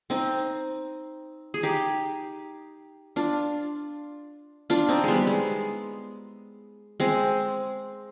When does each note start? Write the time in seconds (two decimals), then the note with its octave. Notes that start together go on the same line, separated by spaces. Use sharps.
0.10 C4 D#4
1.54 G#4
1.63 D#4 G4
3.16 D4 F4
4.70 D4 F4
4.89 C4 D#4
5.04 G3 G#3 B3
5.27 G#3
7.00 G#3 C4